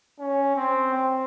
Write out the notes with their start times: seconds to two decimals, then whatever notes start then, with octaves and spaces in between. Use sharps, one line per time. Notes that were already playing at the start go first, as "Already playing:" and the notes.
0.19 C#4
0.56 C4
0.94 C4